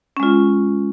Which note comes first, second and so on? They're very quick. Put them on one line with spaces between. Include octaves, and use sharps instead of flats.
C#4 G#3 F4